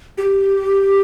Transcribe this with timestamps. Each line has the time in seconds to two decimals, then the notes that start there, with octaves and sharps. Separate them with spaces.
0.18 G4